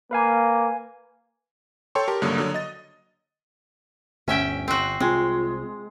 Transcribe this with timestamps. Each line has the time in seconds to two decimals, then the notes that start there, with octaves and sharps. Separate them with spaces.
0.11 A#3 B4 F5 G#5
1.95 A4 C#5 G5 A5 C6 C#6
2.08 G4 A#4 A5
2.22 C#2 G2 D3 F#3 A#3 D#6
2.38 D3 F#3
2.54 D#5 A6
4.28 G1 D2 C#4 E5 G5
4.68 G1 C4 F#4
5.00 C2 G#3 C4 F4